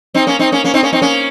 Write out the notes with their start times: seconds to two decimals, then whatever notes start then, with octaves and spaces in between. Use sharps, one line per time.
0.14 C4 D#4
0.27 A#3 C#4
0.39 C4 D#4
0.52 A#3 C#4
0.64 A#3 C#4
0.74 C4 D#4
0.83 A#3 C#4
0.93 C4 D#4
1.02 A#3 C#4